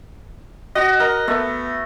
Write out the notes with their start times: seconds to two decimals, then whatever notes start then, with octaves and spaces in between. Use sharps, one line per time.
0.75 F#4 D#5
1.00 A#4 D#5
1.28 A3 B3